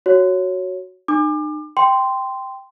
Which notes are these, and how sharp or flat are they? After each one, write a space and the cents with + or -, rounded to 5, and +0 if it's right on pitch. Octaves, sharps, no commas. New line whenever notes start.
F#4 +0 C#5 +0
D#4 -40 D6 +30
G5 +0 C6 -10